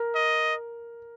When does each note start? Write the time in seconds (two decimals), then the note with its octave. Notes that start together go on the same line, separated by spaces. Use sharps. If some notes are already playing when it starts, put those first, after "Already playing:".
Already playing: A#4
0.15 D#5